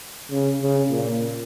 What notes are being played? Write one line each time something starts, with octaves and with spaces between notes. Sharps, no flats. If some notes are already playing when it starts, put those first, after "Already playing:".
C#3
C#3
A#2